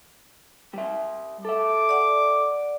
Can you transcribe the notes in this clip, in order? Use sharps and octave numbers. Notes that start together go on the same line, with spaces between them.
G3 E5
A4 E5 D6
D5 F#5